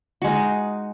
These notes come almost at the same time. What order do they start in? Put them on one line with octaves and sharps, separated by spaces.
F#4 G#3 D#4